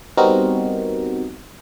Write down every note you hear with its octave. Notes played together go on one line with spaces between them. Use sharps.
G3 B3 C4 D#4 F#4 A#4